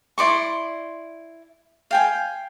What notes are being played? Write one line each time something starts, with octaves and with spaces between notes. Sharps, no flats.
E4 D5 C6 C#6
F5 G5 G#5